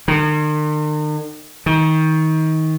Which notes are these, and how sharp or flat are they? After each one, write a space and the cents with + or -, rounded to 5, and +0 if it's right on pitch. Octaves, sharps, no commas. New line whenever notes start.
D#3 -45
D#3 +25